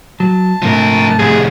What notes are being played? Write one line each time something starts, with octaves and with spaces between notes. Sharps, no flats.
F#3 A5
G#2 C3 F3 A3 A#4
C2 F2 G#4